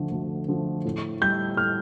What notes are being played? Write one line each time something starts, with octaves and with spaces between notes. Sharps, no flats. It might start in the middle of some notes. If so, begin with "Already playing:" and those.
Already playing: D2 D3 F3 A3
D2
D3 F3 A3
A2
G3 G6
A2 F6